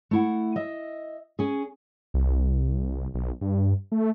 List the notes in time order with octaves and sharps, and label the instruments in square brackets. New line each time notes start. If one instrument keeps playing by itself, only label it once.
[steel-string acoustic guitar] A3 E4 F#5
D#5 E5
C#4 G#4
[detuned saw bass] C2
B1
G2
A3